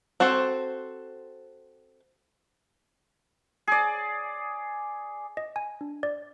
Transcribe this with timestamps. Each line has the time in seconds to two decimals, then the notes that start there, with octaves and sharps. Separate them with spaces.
0.20 C4 F#4 A4 C5
3.67 G#4 D5
5.37 D#5
5.56 G#5
5.81 D4
6.03 D5